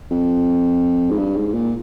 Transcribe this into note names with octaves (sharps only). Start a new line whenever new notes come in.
F2
G#2
G2
G#2
A#2